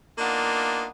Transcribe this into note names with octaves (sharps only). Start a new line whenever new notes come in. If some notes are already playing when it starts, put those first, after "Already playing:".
A#3 B3 D4 D#4 F4